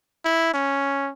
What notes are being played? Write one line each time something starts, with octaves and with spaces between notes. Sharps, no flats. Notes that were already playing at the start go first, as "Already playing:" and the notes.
E4
C#4